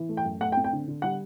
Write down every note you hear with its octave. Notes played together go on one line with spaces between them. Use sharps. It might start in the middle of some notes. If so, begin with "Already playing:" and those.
Already playing: E3
A3
G5
F#2
A3 F#5
G5
C4
G5
D3
D3
G3 F#5